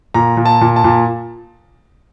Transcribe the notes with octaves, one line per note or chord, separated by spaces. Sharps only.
A#2 A#5
A#2
A5
A#2
A5
A#2